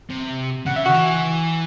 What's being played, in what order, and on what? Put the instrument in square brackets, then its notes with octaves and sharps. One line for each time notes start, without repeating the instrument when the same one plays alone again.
[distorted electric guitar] C3
[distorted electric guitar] C#3 [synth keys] F#5
[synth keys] E5
[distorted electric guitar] D#3 [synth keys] F#4 F#5
[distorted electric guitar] E3